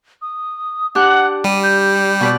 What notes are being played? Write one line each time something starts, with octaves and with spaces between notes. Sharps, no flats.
D#6
D4 G4 F#5 F#6
G3 D#7
G6
B2 B4 D5